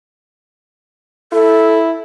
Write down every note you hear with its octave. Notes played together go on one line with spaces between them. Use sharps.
E4 A4